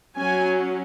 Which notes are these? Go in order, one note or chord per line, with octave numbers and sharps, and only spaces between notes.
F#3 C#4 G#5